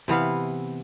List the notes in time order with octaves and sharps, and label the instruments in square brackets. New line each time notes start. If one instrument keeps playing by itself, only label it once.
[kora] C3 E3 B3 F5